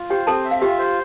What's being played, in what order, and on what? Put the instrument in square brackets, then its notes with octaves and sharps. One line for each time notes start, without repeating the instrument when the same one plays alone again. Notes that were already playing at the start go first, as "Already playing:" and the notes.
Already playing: [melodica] F4
[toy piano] G4 G5 [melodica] C5
[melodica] C4 [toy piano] A4 A5
[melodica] E5
[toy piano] F5
[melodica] F4 [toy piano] G4 G5
[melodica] C5